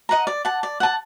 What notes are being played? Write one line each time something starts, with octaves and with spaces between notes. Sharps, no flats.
D#5 F#5 A#5
D5
F#5 A5
D5
F#5 A5